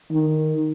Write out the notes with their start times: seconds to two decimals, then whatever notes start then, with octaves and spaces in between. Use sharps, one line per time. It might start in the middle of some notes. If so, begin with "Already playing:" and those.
0.12 D#3